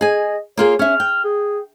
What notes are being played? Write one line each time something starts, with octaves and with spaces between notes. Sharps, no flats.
G#4 D#5 G#5
A#3 F4 G#4 C#5
C#4 E5 F6
G5
G#4